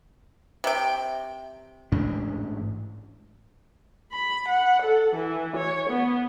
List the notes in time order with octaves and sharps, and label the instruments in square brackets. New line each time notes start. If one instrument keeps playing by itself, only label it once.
[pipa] C3 G5
[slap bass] A1 G#2 D4
[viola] B5
F#5
A4
E3
C#5
B3